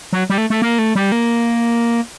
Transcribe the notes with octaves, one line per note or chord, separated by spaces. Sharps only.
F#3
G3
A3
A3
A#3
A3
G3
A#3